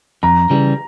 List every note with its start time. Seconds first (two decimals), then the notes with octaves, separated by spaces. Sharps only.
0.23 F2 A#5
0.50 C#3 E3 G3